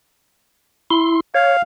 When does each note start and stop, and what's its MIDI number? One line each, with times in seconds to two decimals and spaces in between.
0.91 1.20 64
0.91 1.20 84
1.35 1.57 73
1.35 1.62 77